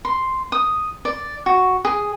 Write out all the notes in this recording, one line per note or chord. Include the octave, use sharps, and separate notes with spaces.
C6
D#6
D5
F#4
G#4